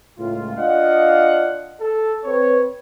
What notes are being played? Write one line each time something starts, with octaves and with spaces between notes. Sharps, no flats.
C#2 A2 F4
D4 F4 D5 D#5 F5 F#5
A4
C4 B4 C#5